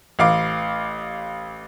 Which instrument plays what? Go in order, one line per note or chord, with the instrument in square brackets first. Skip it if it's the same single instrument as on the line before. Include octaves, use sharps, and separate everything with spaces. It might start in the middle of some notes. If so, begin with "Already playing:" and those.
[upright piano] A1 F5 D6